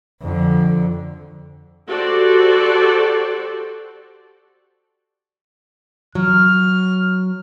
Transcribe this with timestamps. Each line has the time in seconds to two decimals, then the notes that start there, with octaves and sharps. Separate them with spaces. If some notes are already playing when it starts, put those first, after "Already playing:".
0.22 F2 D3
1.90 F#4 G4 A4 C5 D5
6.15 F#3 F6